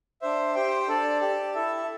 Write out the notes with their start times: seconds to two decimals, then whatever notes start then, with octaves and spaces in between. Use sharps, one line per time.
0.22 D4 C5 E5
0.55 G4 C5 G5
0.87 D4 A4 D5 A5
1.21 G4 D5 A5
1.54 E4 A4 E5 A5